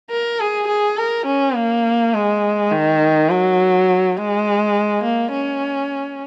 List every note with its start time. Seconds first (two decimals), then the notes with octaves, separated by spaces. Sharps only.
0.10 A#4
0.39 G#4
0.68 G#4
0.97 A#4
1.27 C#4
1.55 A#3
2.14 G#3
2.71 D#3
3.30 F#3
4.17 G#3
5.04 A#3
5.33 C#4